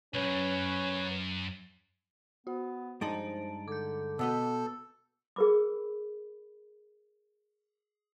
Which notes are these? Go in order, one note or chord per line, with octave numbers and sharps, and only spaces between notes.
B1 F#2 C#4 B4 C#5
B3 F#4
G2 F3 G#3 D#4 A5 A6 D7
D3 D6 G6
B2 B3 A4 D#5
G#4 A#4 B4 B5 D6